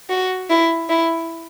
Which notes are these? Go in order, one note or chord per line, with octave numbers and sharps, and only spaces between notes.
F#4
E4
E4